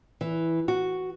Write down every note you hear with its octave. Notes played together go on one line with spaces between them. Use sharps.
E3
F#4